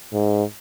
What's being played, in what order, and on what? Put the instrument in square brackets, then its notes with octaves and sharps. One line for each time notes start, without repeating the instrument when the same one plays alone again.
[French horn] G#2